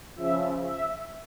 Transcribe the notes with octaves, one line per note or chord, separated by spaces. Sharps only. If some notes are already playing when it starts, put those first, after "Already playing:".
C#3 F3 E5
E5